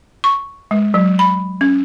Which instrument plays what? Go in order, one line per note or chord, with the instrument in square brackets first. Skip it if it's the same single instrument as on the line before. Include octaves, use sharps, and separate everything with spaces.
[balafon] C#6
G#3
F#3
B5
C#4